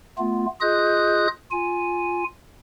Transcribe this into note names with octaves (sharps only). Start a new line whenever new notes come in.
A3 B3 F4
F4 G#4 D#5 D#6 F#6 G6
F4 G#5